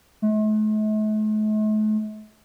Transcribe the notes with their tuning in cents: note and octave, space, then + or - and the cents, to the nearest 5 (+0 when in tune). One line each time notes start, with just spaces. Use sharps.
A3 -45